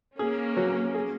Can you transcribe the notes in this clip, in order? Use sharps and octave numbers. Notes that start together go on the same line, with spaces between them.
A#3 C#4 G#4
F#3
G#4